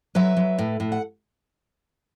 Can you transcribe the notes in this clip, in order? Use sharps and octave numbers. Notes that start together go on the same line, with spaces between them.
F#3 B4 E5
F#3
A2
A2
F#5